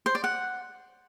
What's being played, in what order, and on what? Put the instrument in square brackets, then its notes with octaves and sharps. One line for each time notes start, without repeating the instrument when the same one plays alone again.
[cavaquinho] C5
D5
F#5